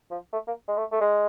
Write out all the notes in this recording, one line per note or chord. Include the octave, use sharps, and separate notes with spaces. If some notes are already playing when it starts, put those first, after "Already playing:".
F3
A3
A#3
G#3
A3
A3
G#3